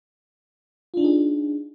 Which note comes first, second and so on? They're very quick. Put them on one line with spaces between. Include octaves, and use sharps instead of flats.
F4 D4 D#4 G#4